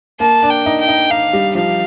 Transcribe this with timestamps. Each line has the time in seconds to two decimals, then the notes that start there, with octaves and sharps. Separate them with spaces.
0.20 A#3 A5
0.43 D4
0.50 G5
0.66 D#4
0.80 G5
0.88 D#4
1.10 D#4 F5
1.33 G3
1.55 F3 F5